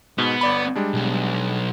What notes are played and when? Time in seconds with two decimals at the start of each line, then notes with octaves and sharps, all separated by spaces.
0.18 G#2 B2 B3
0.41 G1 D5 B5
0.76 G3 G#3 D4
0.94 B1